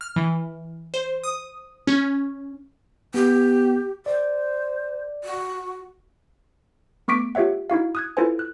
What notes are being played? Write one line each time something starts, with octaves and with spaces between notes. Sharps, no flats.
F6
E3
C5
D#6
C#4
B3 G4
C5 D5
F#4
A3 B3 C#6 D6 B6 D7
F4 G4 C#5 E5 F#5
D#4 E4 F#4 F5
D#6 F#6 G#6
E4 F4 A4 B4 C5 G#5
F#6